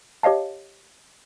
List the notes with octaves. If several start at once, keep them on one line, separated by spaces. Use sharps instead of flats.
G4 C#5 D#5 F5 A5